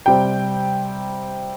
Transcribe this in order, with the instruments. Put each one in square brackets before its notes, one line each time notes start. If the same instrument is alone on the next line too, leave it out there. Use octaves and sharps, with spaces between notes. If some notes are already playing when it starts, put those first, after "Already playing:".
[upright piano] C3 G3 C4 G5